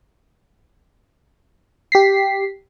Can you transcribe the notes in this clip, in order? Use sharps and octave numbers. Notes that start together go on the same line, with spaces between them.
G4 B6 C7